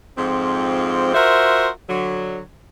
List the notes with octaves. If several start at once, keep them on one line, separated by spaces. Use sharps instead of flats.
F2 G#2 F3 C4
F4 F#4 A#4 C5 E5
D3 F#3